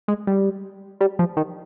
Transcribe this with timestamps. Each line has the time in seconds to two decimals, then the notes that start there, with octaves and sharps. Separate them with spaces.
0.08 G#3
0.27 G3
1.01 G3
1.19 F3
1.37 D#3